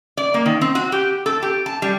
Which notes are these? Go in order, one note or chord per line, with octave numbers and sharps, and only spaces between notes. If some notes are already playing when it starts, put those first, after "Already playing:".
D5
A#3
D#3
C4
F#4
G4
A4
G4
A5
G3